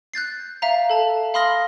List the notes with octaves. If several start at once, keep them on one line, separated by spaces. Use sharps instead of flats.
F#6 G6 A6 C7
E5 F5 A#5
A4 A5
F5 B5 C6 D#6 F6 A#6